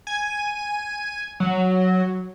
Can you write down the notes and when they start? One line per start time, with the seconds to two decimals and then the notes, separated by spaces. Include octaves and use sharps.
0.07 G#5
1.40 F#3